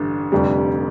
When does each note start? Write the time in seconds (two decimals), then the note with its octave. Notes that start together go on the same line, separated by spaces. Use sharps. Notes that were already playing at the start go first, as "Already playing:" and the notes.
Already playing: A1 G2 D3
0.32 F1 F2 D3 G3